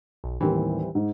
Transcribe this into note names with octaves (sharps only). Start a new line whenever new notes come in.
B1
D#2 A2 E3 G3 C4
G#2